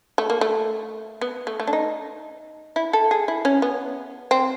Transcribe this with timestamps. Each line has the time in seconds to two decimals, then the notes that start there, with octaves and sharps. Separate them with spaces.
0.18 A3
0.30 A#3
0.41 A3
1.21 B3
1.47 A3
1.60 A3
1.67 D4
1.73 D#4
2.76 E4
2.93 A4
3.11 G#4
3.28 E4
3.45 C#4
3.62 B3
4.31 C4